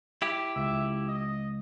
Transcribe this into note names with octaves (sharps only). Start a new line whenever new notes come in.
E4 G4
C#2 E5
D#5